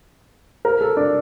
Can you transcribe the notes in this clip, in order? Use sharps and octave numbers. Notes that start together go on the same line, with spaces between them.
A#4
A4
D4